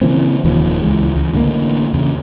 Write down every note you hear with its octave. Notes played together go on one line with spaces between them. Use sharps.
C#3 E3 A#3 C4
D#1 D#2 D#3 F3
C#2 E3 G#3
C#2
A1 D3 F#3 A#3
E2 C#3